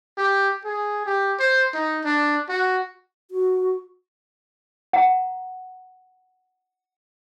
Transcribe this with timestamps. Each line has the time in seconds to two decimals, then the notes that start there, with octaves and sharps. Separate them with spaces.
0.18 G4
0.65 G#4
1.06 G4
1.40 C5
1.74 D#4
2.04 D4
2.49 F#4
3.31 F#4
4.93 F#5 A#5